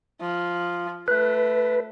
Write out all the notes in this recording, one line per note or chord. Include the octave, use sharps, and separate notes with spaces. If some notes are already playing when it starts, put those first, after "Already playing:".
F3
A3 B4